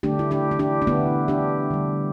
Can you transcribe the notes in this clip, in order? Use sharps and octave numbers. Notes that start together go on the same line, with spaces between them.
D3 A3 D4 G4
E4
D4 G4
E4
D4 G4
D4
D3 A3 B3 E4
D4 G4
D3 G3